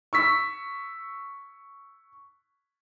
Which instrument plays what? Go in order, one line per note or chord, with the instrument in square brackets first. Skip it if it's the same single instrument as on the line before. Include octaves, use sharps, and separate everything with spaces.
[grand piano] C#6 E6 B6